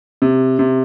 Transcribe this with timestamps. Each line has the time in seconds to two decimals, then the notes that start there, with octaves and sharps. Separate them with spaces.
0.22 C3
0.59 C3